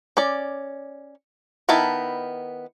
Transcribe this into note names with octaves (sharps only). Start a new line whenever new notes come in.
C#4 D5
D#3 B3 E4 A#4 A5